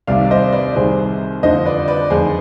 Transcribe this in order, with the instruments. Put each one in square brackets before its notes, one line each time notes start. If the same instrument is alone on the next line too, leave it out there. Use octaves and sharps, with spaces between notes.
[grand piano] C2 C3 D#3 D5 F5
D5
C5 D#5
B4 D5
C2 C3 D#3 G#4 C5
F2 D3 F3 C5 D#5
B4 D5
B4 D5
F2 D#3 G#4 C5